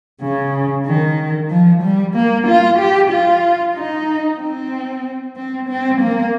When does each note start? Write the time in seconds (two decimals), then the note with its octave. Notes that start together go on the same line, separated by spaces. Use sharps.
0.21 C#3
0.86 D#3
1.50 F3
1.83 G3
2.15 A#3
2.47 F4
2.78 G4
3.11 F4
3.75 D#4
4.40 C4
5.37 C4
5.69 C4
6.01 A#3